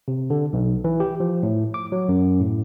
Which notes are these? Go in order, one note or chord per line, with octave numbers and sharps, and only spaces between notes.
C3
D3
B1
E3
G4
F3
A2
D6
F#3
F#2
A2